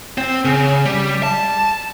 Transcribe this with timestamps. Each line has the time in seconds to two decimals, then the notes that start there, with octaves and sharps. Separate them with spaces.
0.18 C4
0.45 C#3
0.86 G3
1.23 A5